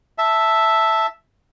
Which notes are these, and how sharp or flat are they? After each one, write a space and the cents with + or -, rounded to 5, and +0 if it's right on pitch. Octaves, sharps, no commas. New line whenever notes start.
E5 +0 A5 +0